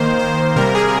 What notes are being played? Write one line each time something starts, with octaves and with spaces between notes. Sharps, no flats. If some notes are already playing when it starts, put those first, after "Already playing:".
Already playing: D#3 A#3 C5
C5
C3 G3 A#3 A#4
G#4